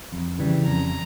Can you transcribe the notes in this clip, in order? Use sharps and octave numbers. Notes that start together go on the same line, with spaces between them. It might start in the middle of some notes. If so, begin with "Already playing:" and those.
F2
C#3 E3 G3
F2 A#5